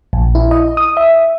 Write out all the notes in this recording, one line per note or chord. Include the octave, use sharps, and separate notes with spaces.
A#1
E4
D#5
D#6
E5